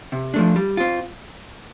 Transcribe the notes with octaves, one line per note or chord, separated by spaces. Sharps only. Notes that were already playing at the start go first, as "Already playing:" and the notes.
C3
F3 A3 D4
G3
C4 F4